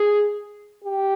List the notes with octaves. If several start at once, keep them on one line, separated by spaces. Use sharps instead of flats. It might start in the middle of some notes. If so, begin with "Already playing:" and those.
Already playing: G#4
G4